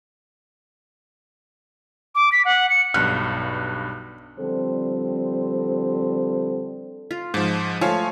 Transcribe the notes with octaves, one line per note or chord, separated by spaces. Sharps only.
D6
B6
F#5
C#7
B1 G2 F6 F#6
D3 F3 G3 C4 A4 C5
F4
G#2 F3 A5 B5
F3 A3 C#5 F5 G#5